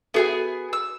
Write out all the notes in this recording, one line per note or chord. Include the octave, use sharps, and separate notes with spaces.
B3 F#4 G#4 A4 E5 G#5
E6